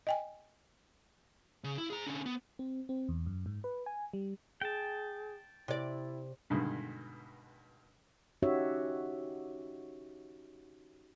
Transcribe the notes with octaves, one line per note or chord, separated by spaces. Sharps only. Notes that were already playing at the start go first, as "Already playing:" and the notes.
D#5 G5 G#5
C#3
E4
G#4 A#5
D3 C#4
B3
C4
C4
E2
F#2
G#2
B4
G#5
G3
G#4 G5 A5
C3 E4 D5
G2 B2 D3 D#3 G#3
C#4 D#4 F#4 G4 C#5 E5